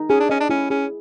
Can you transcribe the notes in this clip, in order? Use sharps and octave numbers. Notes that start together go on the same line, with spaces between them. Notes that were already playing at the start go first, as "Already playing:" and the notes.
Already playing: D#4
C#4 G#4
D4
C#4 D#5
D4
C#4 E4
C#4 G#4